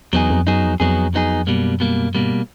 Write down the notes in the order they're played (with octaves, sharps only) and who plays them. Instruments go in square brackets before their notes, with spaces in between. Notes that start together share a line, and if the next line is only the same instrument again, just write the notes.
[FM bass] E2 [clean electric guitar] F#3 B3 D#4 G#4
[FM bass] F2
[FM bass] F#2 [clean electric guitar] F#3 B3 D#4 G#4
[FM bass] F2
[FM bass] F2 [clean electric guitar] F#3 B3 D#4 G#4
[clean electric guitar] F#3 B3 D#4 G#4
[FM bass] F#2 [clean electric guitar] B2 G3 A#3
[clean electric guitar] B2 G3 A#3
[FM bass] G2 [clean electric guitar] B2 G3 A#3